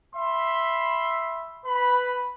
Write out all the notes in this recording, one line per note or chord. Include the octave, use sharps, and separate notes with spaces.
E5 B5 C6
B4 B5